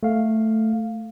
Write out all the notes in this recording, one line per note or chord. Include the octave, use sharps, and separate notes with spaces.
A3 F5